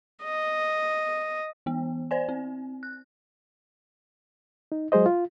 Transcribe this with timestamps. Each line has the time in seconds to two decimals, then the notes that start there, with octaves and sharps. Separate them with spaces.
0.23 D#5
1.66 E3 B3
2.11 C5 D5 G#5
2.29 C4
2.83 F#6
4.72 D#4
4.92 F#3 G#3 G#4 C5 D#5
5.06 F4